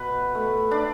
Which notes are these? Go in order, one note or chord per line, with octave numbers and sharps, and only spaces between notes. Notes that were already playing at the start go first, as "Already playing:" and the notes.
Already playing: B2 B4
A3
D4